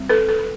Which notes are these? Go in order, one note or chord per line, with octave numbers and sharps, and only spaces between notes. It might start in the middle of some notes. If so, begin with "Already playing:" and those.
Already playing: G3 C4
A4 B4
A4 B4
B4